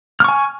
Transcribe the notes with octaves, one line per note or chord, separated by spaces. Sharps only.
G#5 C#6 F6